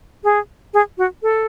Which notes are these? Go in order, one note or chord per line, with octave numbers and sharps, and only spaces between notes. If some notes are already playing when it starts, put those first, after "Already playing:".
G#4
G#4
F#4
A4